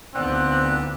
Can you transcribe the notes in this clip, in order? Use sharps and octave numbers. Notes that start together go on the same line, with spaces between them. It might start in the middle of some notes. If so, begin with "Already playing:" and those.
D2 F3 B3 C4 D#4 D5 F#6